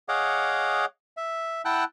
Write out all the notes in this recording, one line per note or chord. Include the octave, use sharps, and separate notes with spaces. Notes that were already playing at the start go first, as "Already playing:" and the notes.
G#4 C#5 D#5 F5 F#5 D6
E5
E4 F#5 G5 A5 E6 F#6